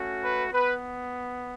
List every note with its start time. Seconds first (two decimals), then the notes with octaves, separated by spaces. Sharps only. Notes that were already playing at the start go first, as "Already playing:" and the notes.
Already playing: A3 C#4 F#4
0.22 B4
0.51 B3 B4